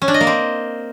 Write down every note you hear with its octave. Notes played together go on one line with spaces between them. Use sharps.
C#4
D4
D#5
A#3
C4